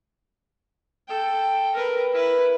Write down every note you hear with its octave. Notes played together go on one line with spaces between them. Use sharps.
A4 G5
A#4 B4
E4 B4